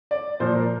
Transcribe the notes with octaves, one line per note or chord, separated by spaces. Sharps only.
D5
A#2 F3 C5
A#4